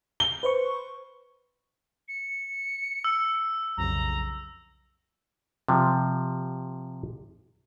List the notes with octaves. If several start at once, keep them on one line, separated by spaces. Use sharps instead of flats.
G7
B4 C5 C#6
C#7
E6
B1 F2 C#3 A#5
C3 F3